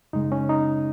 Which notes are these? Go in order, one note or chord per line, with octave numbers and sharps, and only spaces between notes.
F#2 C#3 G#3 D#4
C#4
D#4